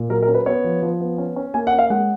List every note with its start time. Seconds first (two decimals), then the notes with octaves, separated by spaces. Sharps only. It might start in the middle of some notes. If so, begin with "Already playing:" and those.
Already playing: A#2
0.10 F#3 A#4
0.22 A#4
0.28 C#4
0.34 B4
0.46 B3 C#5
0.64 F3
0.82 F3
1.00 B3
1.18 C#4
1.36 C#4
1.54 A#3 G#5
1.67 F#5
1.73 C#4
1.79 F5
1.90 G#3 F#5